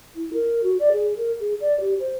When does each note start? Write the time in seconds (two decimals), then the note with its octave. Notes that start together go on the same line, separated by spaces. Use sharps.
0.15 E4
0.33 A#4
0.63 F#4
0.79 D5
0.92 G#4
1.16 A#4
1.39 G#4
1.60 D5
1.79 G4
1.99 C5